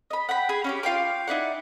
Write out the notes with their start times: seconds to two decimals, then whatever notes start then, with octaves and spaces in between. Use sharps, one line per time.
0.10 D#5 B5
0.29 F#5 G5 B5
0.49 G#4 B5
0.64 C#4 F#4 G4
0.83 F4 F5 G5 D6
1.28 D#4 E4 D5 F#5